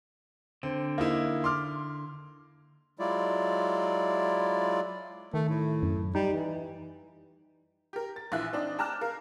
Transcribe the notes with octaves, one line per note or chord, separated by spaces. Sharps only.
D3 C4
A#3 D#4 E4
C6 D6 F6
F#3 G#3 E4 F4 D5
D#3 A3
A2
F#2
G3 D#4
E3
G4 A#4
A6
A#1 E3 F4 E5 F#6
C4 D4 D#4
G5 A5 A#5 D6 F6 F#6
A#4 F5